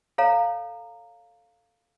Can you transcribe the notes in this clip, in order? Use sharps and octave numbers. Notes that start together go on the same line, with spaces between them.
A4 C#5 F5 A#5